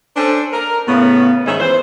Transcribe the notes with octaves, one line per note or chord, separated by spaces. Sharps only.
C#4 D4 A4 C5
A#4
A2 C#3 B3
G#2 D#3 C#4 D#4 G#4 E5
E3 C5